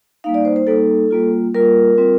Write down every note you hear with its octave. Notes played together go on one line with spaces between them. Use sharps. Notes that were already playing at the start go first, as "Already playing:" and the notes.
G3 A#3 D#4 F5
D5
C5
C5
G3 A#3 D#4 A4
G3 A#3 F4
G3 A#3 F4 A#4
G3 C4 F4